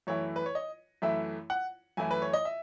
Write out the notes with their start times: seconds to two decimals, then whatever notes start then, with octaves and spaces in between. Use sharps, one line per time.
0.07 F#2 E3 A3 E4 C#5
0.36 B4
0.46 C#5
0.55 D#5
1.02 F#2 E3 A3 E4 E5
1.50 F#5
1.97 F#2 E3 A3 E4 G#5
2.11 B4
2.22 C#5
2.33 D#5
2.45 E5